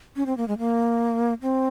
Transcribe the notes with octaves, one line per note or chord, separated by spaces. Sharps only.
C#4
C4
A#3
G#3
A#3
C4